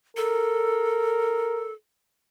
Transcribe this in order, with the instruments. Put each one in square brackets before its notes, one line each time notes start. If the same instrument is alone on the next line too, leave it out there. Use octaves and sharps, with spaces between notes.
[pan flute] A4 [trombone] A#4